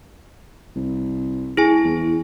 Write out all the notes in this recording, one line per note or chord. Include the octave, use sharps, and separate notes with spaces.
C2
E4 G#4 G#5
E2